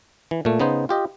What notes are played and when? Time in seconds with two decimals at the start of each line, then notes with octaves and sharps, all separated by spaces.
0.31 E3
0.45 A#2 A3
0.60 C#3 B3 D#4 C5
0.89 F4 G4 D#5